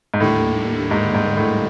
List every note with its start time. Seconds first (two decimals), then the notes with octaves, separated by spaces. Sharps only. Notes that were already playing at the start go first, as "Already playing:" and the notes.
0.14 G#2
0.20 D#2 A2 D3 G3 A#3
0.91 G#2
1.14 G#2
1.37 A2